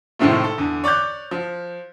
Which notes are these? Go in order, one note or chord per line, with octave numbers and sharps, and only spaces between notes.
A2 C3 D#3 F3 G#3 A3
A4
E2 D3
C#5 D5 D6 F#6 G6
F3